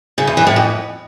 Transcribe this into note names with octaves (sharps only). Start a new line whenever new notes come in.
C#3
E2
E3
A2
F2